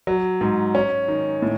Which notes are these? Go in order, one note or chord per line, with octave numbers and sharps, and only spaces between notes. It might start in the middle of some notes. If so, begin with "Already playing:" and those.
F#3
G#2
C#4
D#3
A2